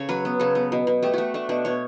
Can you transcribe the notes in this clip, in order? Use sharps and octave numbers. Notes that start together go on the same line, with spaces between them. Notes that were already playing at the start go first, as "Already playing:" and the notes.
Already playing: C#3 C#4 A4 C#5
F#3 B4
B3
C#3 A4
B3
B2
B2
A3 G4
A3 F#4
A3 D4
B2 D4
B2 C#5